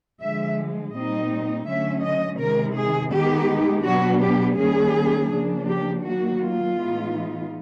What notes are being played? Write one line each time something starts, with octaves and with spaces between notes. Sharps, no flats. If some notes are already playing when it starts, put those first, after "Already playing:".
D3 F3 G#3 E5
A#2 G3 C4 D#4 D#5
D3 F#3 A3 C#4 E5
D#5
C3 D#3 G#3 A#4
G#4
D#3 G#3 B3 D#4 G4
B2 F#3 B3 D4 F#4
G4
D#3 G3 A#3 C#4 G#4
C#3 F3 A#3 D4
G4
D#3 F#3 A#3 F#4
F4
A2 E3 G#3 B3 D#4